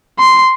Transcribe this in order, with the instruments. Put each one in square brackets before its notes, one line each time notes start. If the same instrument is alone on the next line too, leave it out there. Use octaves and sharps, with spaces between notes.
[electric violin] C6